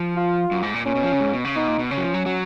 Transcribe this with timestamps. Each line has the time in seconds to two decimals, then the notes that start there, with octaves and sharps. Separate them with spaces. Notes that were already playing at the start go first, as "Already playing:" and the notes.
Already playing: F3
0.16 F4
0.51 F#2
0.63 G#2
0.74 A#2
0.86 A#2 C#4
0.95 B2
1.03 F3
1.12 C#3
1.20 G#2
1.33 B2
1.45 C#3
1.56 B2 D#4
1.68 A#2
1.79 B2
1.91 C#3 C#4
1.97 F#3
2.03 F3
2.14 F#3
2.26 F#3